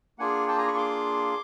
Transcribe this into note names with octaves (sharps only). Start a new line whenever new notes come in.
A#3 D4 F4 G#4 F#5 G#5
G5 A5
G#5 A#5
B5 C#6
C6 D6